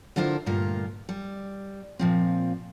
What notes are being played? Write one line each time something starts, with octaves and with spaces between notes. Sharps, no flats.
D3 D4 E4 F4 A#4 C5
D2 G2 A#2 F4 A#4
G3
A#2 F3 C4